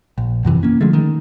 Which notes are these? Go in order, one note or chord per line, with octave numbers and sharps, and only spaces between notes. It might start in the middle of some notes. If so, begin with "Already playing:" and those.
A#1
F#2 C3 E3
A#3 C#4
D3 F3 G#3 A3
D#3